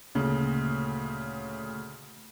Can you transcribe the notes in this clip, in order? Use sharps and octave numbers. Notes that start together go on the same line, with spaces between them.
D2 A#2 C#3